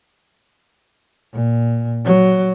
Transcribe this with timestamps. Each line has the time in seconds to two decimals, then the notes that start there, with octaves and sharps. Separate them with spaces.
1.34 A#2
2.05 F#3